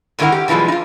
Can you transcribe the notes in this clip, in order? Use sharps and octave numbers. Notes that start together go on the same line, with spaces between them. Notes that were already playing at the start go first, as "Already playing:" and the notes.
G#2 D3 D#3 E4 A#4 F#5
G4
B2 E3 F3 G3 G#3
D#4 F4